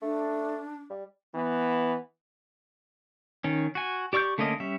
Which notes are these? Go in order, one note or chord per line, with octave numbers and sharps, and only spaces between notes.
A3 D4
G3
E3 B3
D#3 C#4
F#4 G#5
G4 D5 C#6 E6 G6
D3 A3 A#3 C#4 D#5
G3 C#4 E5